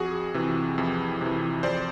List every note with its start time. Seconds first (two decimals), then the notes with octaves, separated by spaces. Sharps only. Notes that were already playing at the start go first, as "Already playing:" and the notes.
Already playing: F2 F#4 G#4
0.34 C3 E3
0.78 F2
1.21 C3 E3
1.63 F2 C5 D5